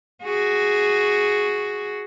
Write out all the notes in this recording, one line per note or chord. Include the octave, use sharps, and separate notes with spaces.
F#4 G#4